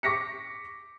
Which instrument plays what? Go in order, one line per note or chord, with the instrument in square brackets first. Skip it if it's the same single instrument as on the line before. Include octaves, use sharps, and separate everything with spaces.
[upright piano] C#6 D6 A#6 B6 C#7